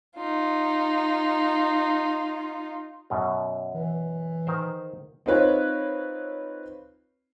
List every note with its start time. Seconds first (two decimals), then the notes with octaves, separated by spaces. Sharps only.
0.17 D#4 F4
3.10 F#2 B2
3.75 E3
4.47 D#3 A#4 C5
5.26 C4 D#4 F4 B4 C#5